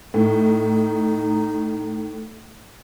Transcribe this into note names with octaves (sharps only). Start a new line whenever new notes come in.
A2 D#4